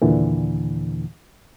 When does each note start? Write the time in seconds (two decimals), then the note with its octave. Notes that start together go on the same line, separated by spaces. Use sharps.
0.02 D#2 A#2 D3 E3